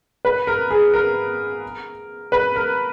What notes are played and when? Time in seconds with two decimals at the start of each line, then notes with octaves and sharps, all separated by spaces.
0.25 B4
0.47 A#4
0.71 G#4
0.94 A#4
2.32 B4
2.56 A#4